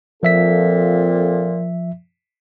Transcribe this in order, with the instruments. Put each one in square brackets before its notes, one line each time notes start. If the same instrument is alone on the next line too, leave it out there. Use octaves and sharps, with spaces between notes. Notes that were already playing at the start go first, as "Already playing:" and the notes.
[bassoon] A#2 [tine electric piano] F3 E5 B6 [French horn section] C4 F4 A4